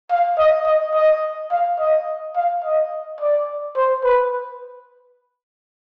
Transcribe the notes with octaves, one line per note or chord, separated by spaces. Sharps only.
F5
D#5
D#5
D#5
F5
D#5
F5
D#5
D5
C5
B4